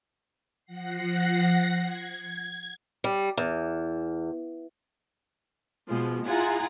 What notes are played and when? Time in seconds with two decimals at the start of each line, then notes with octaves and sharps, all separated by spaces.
0.65 F3 F#5 A#6 C7
1.83 G#6
3.04 G3
3.37 E2
5.87 B2 F3 G#3
6.26 E4 F4 G#4 F#5 G#5 A#5